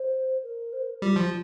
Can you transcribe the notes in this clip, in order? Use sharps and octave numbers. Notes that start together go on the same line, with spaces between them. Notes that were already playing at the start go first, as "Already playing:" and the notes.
Already playing: C5
A#4
C5
A#4
G3 F4
F3